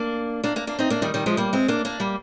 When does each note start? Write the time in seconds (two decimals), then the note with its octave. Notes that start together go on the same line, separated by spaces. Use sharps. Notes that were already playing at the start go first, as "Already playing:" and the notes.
Already playing: A#3 D4
0.44 A#3 D4
0.56 A#3 D4
0.67 A#3 D4
0.79 C4 D#4
0.90 A#3 D4
1.02 D#3 G3
1.14 D#3 G3
1.26 F3 G#3
1.37 G3 A#3
1.53 G#3 C4
1.68 A#3 D4
1.85 A#3 D4
2.00 G3 A#3